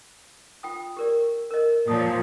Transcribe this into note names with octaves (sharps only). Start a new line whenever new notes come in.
F4 G5 D#6
G4 A#4 D5
A#4 D#5
A#2 F3 C#5 A5 D#6